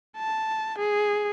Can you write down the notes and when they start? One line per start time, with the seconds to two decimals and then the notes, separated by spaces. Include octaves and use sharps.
0.17 A5
0.78 G#4